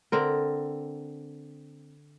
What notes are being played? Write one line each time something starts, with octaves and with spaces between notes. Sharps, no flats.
D3 C4 A#4